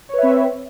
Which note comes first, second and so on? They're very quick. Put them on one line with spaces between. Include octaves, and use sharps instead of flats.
C#5 B4 E5 C4